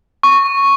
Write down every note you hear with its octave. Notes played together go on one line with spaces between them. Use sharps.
C#6